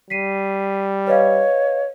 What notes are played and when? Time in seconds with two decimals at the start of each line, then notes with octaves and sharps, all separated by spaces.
0.10 G3 B6 C7 D#7
1.07 B4 C#5 D#5 F5